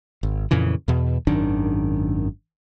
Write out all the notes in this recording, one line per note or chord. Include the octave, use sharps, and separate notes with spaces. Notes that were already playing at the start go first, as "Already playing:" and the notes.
G#1
F2 A#2 C#3 E3
E2 B2
G#1 F#2 D#3 D4